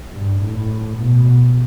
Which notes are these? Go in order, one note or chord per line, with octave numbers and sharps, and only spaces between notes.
G2
A2
B2